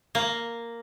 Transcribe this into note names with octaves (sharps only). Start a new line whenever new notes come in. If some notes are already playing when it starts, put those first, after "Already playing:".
A#3